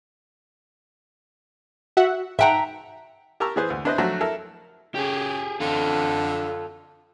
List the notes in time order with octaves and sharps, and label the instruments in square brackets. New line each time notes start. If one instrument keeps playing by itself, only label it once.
[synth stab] F#4 E5 F#5
[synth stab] G#2 F#5 [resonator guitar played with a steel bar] E5 G5 A#5
[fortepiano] G4 A#4 A5 A#5 C#6 E6
E3 B3 G#4 B4 C5
D2
D4 E4 B4 C5 D#5
F3 F#3 A3 D4 F#4
E4 A4 A#4
[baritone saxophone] C#3 [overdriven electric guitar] G4 G#4
[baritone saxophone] D3 [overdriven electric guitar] F4 A4